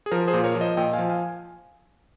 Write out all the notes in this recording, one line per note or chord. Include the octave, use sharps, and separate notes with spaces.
G#4
F3 A#4
G#4 C5
A#2
A#4 C#5
F3
C5 D#5
A#2 D#5 G5
F5 G#5
F3
F5 G#5